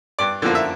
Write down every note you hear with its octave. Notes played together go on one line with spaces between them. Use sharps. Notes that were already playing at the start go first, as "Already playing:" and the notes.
G2 D5
D3 F3 A#3
E5